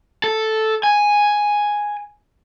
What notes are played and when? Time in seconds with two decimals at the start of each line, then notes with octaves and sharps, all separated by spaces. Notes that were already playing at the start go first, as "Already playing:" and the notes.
0.24 A4
0.83 G#5